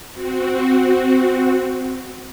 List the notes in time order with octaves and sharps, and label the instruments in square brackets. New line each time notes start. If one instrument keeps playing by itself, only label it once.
[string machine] C4 F#4